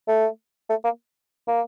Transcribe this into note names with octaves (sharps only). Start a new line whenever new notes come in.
A3
A3
A#3
A#3